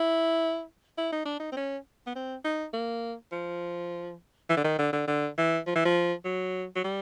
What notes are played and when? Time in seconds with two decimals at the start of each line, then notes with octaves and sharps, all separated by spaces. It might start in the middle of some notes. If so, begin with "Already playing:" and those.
Already playing: E4
0.98 E4
1.12 D#4
1.25 D4
1.40 D#4
1.52 C4
1.57 C#4
2.07 B3
2.15 C4
2.44 D#4
2.73 A#3
3.32 F3
4.50 E3
4.57 D3
4.64 D#3
4.79 D3
4.93 D3
5.07 D3
5.38 E3
5.67 F3
5.75 E3
5.85 F3
6.24 F#3
6.75 F#3
6.84 G3